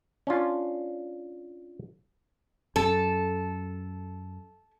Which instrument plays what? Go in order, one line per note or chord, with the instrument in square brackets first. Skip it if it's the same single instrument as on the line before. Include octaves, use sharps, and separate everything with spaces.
[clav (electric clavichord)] C#4 D4 F4
[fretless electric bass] F#2 [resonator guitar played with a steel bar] A4